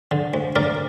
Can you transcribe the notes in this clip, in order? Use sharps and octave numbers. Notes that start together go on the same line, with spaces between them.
D3
D2
D2 A#4 D5